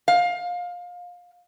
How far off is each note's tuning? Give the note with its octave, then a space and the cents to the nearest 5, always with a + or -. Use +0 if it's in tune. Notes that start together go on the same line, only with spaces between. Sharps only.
F5 +25